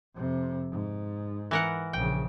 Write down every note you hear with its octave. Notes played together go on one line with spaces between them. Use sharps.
F2 C3
G#2
E3 A#4 F#5
A#1 C#3 G5